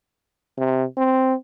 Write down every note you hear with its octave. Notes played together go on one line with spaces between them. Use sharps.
C3
C4